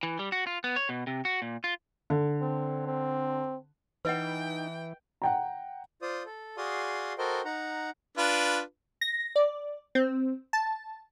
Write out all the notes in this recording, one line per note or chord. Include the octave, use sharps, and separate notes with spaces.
E3
G3
F#4
F4
B3
C#5
B2
C3
F#4
A#2
F4
D3
C4
C4
E3 D#4 B4 D#5 F#5 G5
F#5 G5 A#5
F4 C5 D5 D#6
A4
F#4 G#4 D5 F5 C6 D#6
F#4 A4 A#4 C5 D#5 G5
D#4 F#5 A#5
D4 F4 B4
A#6
D5
C4
A5